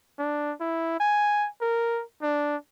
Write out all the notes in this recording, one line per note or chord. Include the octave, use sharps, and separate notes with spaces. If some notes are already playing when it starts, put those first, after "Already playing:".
D4
E4
G#5
A#4
D4